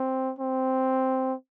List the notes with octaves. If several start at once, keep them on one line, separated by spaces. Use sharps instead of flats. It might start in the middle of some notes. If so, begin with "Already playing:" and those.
Already playing: C4
C4